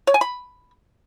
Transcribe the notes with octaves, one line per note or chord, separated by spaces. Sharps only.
C#5
G#5
B5